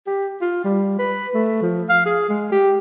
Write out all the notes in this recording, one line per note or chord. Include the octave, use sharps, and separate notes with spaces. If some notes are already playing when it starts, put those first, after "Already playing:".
G4
F4
G3
B4
A3
F3
F5
G#4
G#3
G4